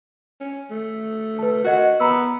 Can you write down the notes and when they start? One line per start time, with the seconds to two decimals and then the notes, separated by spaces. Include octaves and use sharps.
0.40 C#4
0.71 A3
1.39 B4 A5
1.64 F#4 A#4 D#5 F#5
2.00 B3 A#5 B5 E6